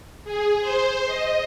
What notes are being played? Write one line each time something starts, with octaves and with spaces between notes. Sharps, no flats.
G#4
C5
D#5